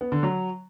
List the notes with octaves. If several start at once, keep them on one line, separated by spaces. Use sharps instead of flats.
B3
D3
F#3